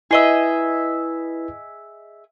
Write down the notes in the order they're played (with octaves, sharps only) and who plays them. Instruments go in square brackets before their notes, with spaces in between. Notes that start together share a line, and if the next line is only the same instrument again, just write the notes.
[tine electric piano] E4 B4 [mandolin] G#4 D#5 E5